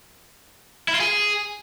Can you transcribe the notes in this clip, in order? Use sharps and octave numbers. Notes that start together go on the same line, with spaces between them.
E4
F4
G#4